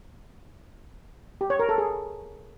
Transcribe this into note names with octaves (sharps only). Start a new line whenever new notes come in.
G4
C#5
A#4
A4
G#4